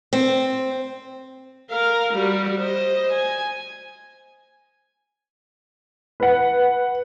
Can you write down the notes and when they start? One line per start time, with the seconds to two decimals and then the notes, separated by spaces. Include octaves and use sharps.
0.13 C4
1.70 A#4 F5
2.13 G3 F#4
2.59 C5 D#5
3.12 G#5
6.20 B4 F#5